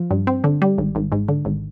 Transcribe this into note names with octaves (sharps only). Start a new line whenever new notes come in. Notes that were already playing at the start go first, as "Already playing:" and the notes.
Already playing: F3
G2
C4
D3
G3
G#1
G#1
G#2
D3
G#1